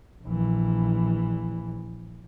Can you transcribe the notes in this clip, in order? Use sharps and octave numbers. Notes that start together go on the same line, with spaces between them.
A#1 E3